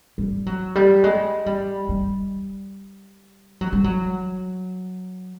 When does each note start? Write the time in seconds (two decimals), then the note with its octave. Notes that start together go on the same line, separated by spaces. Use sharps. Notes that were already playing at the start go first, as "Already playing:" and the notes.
0.18 G3
0.46 F#3
0.75 G3
1.04 G#3
1.46 G3
1.89 G3
3.61 F#3
3.73 G3
3.84 F#3